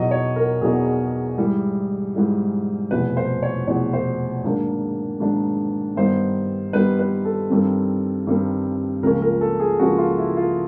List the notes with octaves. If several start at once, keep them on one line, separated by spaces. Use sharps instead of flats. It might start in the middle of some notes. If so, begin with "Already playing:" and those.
Already playing: E2 B2 F#3 B3 D#4 D#5
C#5
A#4
E2 B2 F#3 B3 D#4 G#4
G#2 E3 G3
G#2 E3 G3
F1 E2 B2 B4
C5
C#5
F1 E2 B2 C#5
C5
G#2 D#3 F#3 A#3 D4
G#2 D#3 F#3 A#3 D4
G2 D#3 G3 B3 D#4 C5
G2 D#3 G3 B3 D#4 B4
B4
A4
G2 D#3 G3 C4
G2 D#3 G3 C4
C#2 C#3 F3 A#3 C#4 A#4
A#4
A4
G#4
C#2 C#3 F3 A#3 C#4 F#4
F4
E4
F4